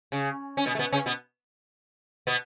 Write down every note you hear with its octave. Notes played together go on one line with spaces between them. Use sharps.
C#3
C#4
B2 B3
A3
B2 B3
C#3 C#4
B2 B3
B2 B3